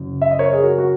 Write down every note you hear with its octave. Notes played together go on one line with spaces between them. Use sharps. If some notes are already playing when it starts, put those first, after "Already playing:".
Already playing: F#1 F#2
E5
D#5
A#4 C#5
G#4
F#4 A#4
F#4